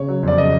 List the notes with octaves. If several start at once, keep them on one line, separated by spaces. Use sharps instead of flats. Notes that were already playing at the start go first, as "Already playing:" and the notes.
Already playing: C#3 C#5
F#3
F2 D5
C#3 D#5